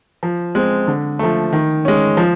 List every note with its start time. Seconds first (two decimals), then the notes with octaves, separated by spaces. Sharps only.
0.23 F3
0.55 G#3 C4
0.87 D3
1.19 F3 A3
1.53 D#3
1.85 G#3 C#4
2.17 F3